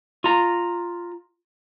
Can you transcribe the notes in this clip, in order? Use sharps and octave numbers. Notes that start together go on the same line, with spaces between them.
F4 A#5